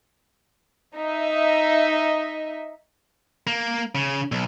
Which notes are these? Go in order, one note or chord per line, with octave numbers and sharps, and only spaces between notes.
D#4 D#5 E5
A#3
C#3
B1